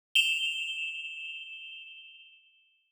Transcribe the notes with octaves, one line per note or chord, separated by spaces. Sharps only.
E7 F7 G7